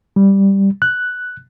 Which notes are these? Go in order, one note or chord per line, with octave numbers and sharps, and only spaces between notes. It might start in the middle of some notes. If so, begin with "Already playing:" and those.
G3
F#6